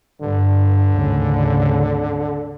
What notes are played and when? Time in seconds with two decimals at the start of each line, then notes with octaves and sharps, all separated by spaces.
0.21 G2 D3
0.94 G#1 D2 C#3